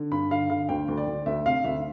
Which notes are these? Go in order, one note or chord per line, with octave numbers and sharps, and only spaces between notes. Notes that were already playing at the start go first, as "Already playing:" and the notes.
Already playing: D3
G2 B5
D3 F5
D3 F5
D2 G5
D2
D5
D2
D2 E5
C3 F5
D2 E5